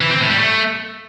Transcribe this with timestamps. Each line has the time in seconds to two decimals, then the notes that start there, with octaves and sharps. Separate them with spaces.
0.01 E3
0.11 C4
0.20 A2
0.30 G3
0.40 A3